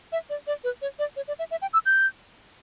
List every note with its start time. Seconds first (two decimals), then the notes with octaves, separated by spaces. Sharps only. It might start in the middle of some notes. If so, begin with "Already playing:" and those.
0.12 E5
0.30 D5
0.47 D5
0.64 B4
0.82 C#5
0.99 D5
1.16 C#5
1.28 D5
1.39 E5
1.51 E5
1.62 G5
1.73 E6
1.86 G6